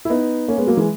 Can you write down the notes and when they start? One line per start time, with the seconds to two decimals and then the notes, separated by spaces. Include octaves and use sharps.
0.05 E4
0.10 B3 D#4
0.48 A#3 C#4
0.58 G#3 B3
0.67 F#3 A#3
0.77 E3 G#3